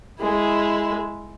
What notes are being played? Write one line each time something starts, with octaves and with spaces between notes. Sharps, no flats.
G#3 E4